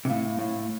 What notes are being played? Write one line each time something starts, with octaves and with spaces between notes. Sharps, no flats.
C3
A2 F5
A2 F5